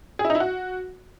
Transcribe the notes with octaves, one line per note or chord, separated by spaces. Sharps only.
G#4
E4
D#4
E4
F#4